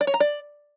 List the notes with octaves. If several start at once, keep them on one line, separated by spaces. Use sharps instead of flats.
D5
C#5
A#5
D5